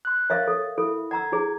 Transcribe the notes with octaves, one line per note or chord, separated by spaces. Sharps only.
C6 F#6
A#4 C#5 E5 F5 A6
A4
E4 A4
F#5 A#5 E6 G#6
E4 G#4